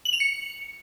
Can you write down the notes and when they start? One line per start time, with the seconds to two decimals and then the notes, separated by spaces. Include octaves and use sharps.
0.05 F#7
0.13 F7
0.20 C#7